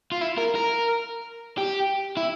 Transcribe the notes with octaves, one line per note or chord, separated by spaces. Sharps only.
F4
E4
A#4
A#4
G4
E4